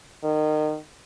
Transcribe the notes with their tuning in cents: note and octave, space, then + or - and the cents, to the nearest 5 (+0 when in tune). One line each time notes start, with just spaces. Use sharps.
D#3 -25